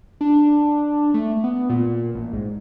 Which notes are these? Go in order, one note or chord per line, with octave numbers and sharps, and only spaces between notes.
D4
A3
B3
A#2
A1
G#2